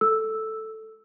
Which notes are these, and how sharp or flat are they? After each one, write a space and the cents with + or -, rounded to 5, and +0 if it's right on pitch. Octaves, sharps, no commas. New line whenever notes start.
A4 +0 E6 +0